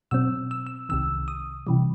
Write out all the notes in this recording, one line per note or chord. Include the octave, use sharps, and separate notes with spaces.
B2 F#3 C4 E6
E6
E6
C2 C3 D#3 E6
D#6
C3 E3 G3